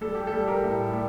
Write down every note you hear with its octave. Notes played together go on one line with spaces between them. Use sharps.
G3 A4
G4
A4
G3
G4 A#4
A2
G3